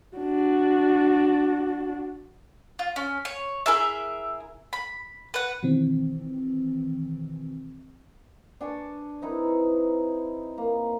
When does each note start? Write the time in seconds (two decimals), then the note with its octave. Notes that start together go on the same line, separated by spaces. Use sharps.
0.17 D4 F#4
2.79 F4
2.96 C#4
3.25 C#5
3.66 E4 G#4 A#4 E5
4.73 B5
5.34 B4 F#5
5.63 B2 D#3 E3 C4
8.61 D4 G#5 A5 C#6
9.22 C4 D#4 E4 B4
10.58 A#3